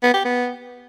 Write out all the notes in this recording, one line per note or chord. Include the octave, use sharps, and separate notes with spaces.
B3
G4
B3